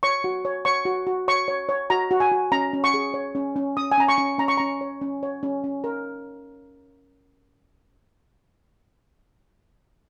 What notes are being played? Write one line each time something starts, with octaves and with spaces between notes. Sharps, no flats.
C#5 C#6
F#4
C#5
C#5 C#6
F#4
F#4
C#5 C#6
C#5
C#5
F#4 A#5
F#4
G#5
F#4
C#4 A#5
C#4
C#6
G#4
C#5
C#4
C#4
C#4 D#6
G#5
C#4 A#5
C#6
C#4
C#4 A#5
C#6
C#4 A#5
C#5
C#4
C#5
C#4
C#4
A#4